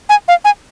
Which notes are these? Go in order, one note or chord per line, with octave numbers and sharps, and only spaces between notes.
G#5
F5
G#5